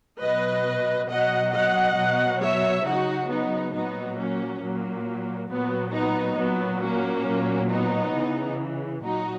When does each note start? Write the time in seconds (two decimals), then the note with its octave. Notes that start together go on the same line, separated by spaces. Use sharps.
0.20 B2 F#3 B4 D#5
1.09 B2 F#3 D#5 F#5
1.53 D#5 F#5
1.98 B2 F#3
2.42 C#5 E5
2.85 C#3 F#3 D#4 F#4
3.29 B3 D#4
3.73 A#2 F#3 B3 D#4
4.18 A#3 C#4
4.62 A#2 F#3 A#3
5.50 A#2 F#3 B3
5.94 B3 D#4
6.38 A#2 F#3 B3
6.83 A#3 C#4
7.27 A#2 F#3
7.71 B3 D#4
8.15 C#3 E3
9.04 A#2 F#3 D#4 F#4